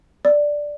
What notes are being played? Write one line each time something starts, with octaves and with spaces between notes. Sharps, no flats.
D5